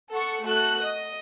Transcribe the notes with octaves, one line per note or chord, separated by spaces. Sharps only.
A4 F#5 C#6 C#7
A3 F#4 A4 F#6
D#5